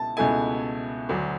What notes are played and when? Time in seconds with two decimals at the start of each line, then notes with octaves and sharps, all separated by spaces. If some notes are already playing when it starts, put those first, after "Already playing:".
Already playing: C#2 B2 E4 A5
0.17 C#2 B2 A3 E4 G#5
1.09 D2 D3 F#3